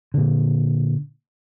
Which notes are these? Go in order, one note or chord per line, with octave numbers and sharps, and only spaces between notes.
A#2 D3